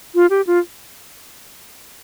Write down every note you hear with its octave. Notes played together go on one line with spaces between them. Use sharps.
F4
G4
F4